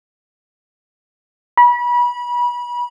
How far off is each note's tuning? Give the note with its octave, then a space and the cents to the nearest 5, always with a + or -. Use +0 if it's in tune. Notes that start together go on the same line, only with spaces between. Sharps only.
B5 -30